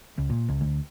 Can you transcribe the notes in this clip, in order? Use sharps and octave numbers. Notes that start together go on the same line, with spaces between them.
C#2
A#2
C#2
D2